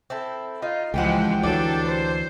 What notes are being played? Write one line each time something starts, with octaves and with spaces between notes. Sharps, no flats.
C4 E4 A4
D#4 F4
C#2 E3 F3 G#3 G4 D#5 F#5 G5
D2 E3 F#3 D4 G4 A4 D5
C5